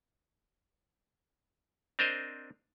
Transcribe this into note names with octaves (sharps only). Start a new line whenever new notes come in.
C4 D4 A#4 C5 D#5